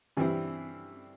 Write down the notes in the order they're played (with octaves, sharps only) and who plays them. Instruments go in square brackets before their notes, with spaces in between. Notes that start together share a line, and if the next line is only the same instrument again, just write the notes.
[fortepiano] G2 E3 G3 C4 E4